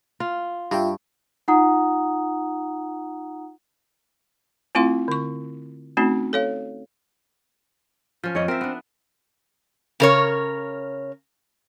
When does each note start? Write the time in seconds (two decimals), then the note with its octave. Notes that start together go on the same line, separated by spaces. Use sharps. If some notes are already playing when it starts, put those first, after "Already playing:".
0.20 F4
0.71 G2 F4 E5 G5
1.48 D#4 F4 F#5 A#5 D#6
4.75 A3 C4 E4 F4 F5 C6
5.08 D3 C#6
5.97 A3 C4 C#4 D#4 F#4
6.33 A4 C#5 F5
8.23 F3 C#4
8.35 F2 C#5 D#5
8.48 C4 A#4 E5
8.61 B3 D4
10.00 C#3 A#4 C#5